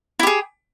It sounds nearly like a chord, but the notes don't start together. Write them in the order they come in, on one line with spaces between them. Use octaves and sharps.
E4 G4 G#4